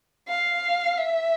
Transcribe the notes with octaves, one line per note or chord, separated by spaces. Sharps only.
F5
E5